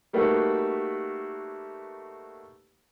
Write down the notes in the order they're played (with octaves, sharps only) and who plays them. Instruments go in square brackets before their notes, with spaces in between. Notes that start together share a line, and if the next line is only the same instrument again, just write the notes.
[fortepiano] G3 A3 A#3 D#4 F#4 B4